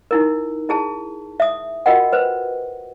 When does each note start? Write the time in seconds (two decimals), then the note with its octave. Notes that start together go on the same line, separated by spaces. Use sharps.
0.11 D#4 E4 A#4
0.69 E4 G#4 A5
1.40 E5 D#6
1.86 F4 F#4 A#4 D#5 F#5 G5
2.13 B4 C5